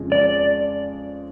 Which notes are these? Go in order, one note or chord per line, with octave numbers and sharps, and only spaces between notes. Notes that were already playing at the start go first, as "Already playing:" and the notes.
Already playing: F2 C#3 F3 G#3
D5